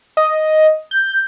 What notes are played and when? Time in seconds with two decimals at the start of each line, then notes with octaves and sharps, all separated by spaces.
0.17 D#5
0.91 G6